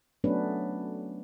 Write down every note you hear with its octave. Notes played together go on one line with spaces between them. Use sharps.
F#3 A3 B3 C#4 D4 B4